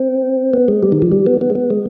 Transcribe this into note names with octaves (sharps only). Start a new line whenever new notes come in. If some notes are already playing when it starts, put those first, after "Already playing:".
Already playing: C4
B3
G#3
G3
D#3
F3
G3
B3
B3
G#3
B3
G#3